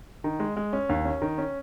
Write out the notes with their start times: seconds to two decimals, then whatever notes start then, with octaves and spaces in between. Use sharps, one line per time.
0.24 D#3
0.40 G#3
0.57 G#3
0.73 C#4
0.89 D#2
1.05 C#4
1.22 D#3
1.38 C#4